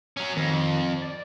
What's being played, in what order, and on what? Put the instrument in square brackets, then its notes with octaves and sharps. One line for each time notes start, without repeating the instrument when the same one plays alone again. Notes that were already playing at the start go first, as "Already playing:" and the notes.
[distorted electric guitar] F#3 C#4
[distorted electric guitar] F2 [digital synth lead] D#3
[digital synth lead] D5